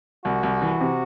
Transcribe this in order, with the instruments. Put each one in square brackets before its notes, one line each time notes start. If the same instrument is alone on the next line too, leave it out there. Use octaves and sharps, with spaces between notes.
[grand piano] C2 [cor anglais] F#4
[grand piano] C2
E3
C3